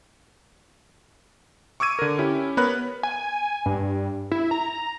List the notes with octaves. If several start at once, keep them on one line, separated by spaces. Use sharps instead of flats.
C#6 D6 E6 G#6 D#7
D3 A#4
C#4 E4 G4
B3 A#4 B4 C#5 B5 F#6
G#5
G2
E4
A#5